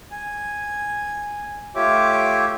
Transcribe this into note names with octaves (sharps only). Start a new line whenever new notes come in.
G#5
A3 F4 G4 C#5 E5 D6